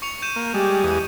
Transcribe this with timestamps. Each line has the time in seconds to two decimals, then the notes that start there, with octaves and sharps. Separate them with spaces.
0.02 C#6 C#7 F7
0.22 G6 D#7 E7
0.36 A#3
0.54 G3 G#3 G4
0.84 E2 G#3 D#6